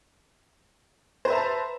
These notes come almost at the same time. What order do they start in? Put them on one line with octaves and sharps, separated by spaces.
C5 B4 E5 A#5 A5